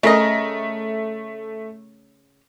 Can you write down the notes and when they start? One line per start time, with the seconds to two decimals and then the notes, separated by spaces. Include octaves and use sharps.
0.03 C#3 A3 A#4 D#5